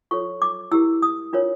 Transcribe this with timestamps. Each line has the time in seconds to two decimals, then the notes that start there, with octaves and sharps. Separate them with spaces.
0.11 F4 A4 C#5 C#6
0.42 D6
0.72 E4 G4 A#4 E6
1.02 D#6
1.33 D4 F4 A#4 C#5